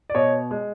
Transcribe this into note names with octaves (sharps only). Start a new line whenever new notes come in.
D5
B2 C#5 D#5
G#3